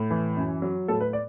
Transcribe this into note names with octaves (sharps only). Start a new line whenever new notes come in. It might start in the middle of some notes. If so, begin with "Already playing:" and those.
Already playing: A2
E3
F#2
F#3
A2 A4
B4
D5